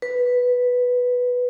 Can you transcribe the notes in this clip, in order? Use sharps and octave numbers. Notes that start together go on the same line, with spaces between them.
B4